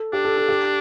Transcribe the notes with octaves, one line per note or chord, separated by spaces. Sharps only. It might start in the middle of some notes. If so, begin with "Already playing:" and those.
Already playing: A4
D4 G4
A4
A4
G4